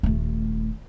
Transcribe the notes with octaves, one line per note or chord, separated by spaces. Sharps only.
D#1 A3